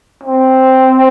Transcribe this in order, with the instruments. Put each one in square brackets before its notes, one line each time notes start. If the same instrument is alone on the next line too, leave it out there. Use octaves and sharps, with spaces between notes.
[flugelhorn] C4